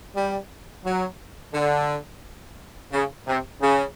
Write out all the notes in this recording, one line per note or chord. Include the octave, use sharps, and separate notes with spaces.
G3
F#3
D3
C#3
C3
C#3